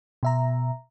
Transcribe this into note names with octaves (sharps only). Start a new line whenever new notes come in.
B2 E5 A#5